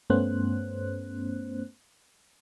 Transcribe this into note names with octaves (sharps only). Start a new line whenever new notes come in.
G2 A3 B3 C#4 C5 F#6